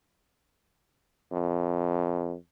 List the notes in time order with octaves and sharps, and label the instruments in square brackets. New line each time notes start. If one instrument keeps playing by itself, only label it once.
[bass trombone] F2